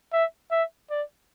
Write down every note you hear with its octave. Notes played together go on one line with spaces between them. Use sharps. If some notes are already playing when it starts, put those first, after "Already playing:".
E5
E5
D5